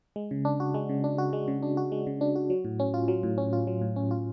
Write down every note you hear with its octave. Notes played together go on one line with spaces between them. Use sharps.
G#3
C#3
D4
F#4
G#3
C#3
D4
F#4
G#3
C#3
D4
F#4
G#3
C#3
D4
F#4
F#3
A2
C#4
F4
F#3
A2
C#4
F4
F#3
A2
C#4
F4